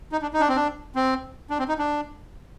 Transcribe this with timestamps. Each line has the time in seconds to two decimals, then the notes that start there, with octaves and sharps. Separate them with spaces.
0.12 D#4
0.22 D4
0.33 D#4
0.40 D4
0.49 C4
0.56 D4
0.95 C4
1.50 D4
1.59 C4
1.69 D#4
1.79 D4